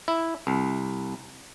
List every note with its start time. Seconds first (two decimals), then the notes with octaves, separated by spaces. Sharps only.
0.08 E4
0.47 C2